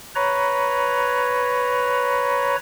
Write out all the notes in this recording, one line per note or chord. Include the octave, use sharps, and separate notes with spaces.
B4 C#5 A#5